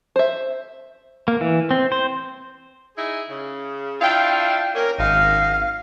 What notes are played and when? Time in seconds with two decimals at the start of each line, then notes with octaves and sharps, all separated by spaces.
0.16 C5 E5
1.28 A#3
1.41 E3
1.71 C4
1.92 C5
2.98 D#4 E4 G#4
3.29 C#3
4.01 D4 E4 F4 F5 G5
4.75 A#3 C#4 A#4
4.98 G#1 F#2 D#4 F5